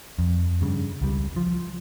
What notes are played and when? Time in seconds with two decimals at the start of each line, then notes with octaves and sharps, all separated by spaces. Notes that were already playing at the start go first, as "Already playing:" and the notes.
0.19 F2
0.61 G2 C#3
1.01 C#2 G3
1.36 F3